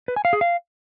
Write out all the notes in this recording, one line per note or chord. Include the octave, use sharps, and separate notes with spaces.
B4
G#5
F5
G#4
F5